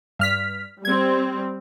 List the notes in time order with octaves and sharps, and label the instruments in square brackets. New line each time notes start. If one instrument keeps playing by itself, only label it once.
[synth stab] G2 F6 B6
[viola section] G3 C4 [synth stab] G#6